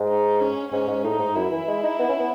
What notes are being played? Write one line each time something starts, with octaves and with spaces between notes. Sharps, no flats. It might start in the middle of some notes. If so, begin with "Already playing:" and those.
Already playing: G#2
D#4
C#4
G#2 C#4
G#2
A2 D#4
G#2
F#2 E4
E3
G#3
D#4
B3
C#4
B3